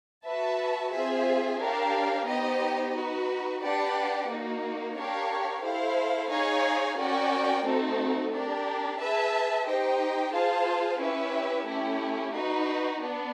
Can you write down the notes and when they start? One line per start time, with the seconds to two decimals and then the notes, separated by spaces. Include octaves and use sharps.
0.25 F#4 B4 E5 A5
0.91 C4 F4 G#4 C5 E5
1.59 D4 G4 A#4 C#5 F5
2.26 B3 D#4 G4 C5 D#5
2.94 D#4 F#4 B4
3.61 D4 G4 B4 D5 F#5
4.28 A#3 D#4 F#4
4.96 D4 G4 A#4 C#5 F5
5.63 E4 A4 C5 F5
6.29 D#4 G#4 C#5 F5 G#5
6.97 C#4 F#4 A#4 D5 G5
7.63 A3 C4 D#4 F#4 A4
8.31 D4 G4 A#4
8.98 G#4 B4 E5 A5
9.65 D#4 G4 C5 D#5 G5
10.32 F4 G#4 C5 F5 A5
11.00 C#4 E4 G4 B4 E5
11.66 A3 C#4 E4 G4
12.33 D#4 F#4 B4
13.01 B3 D4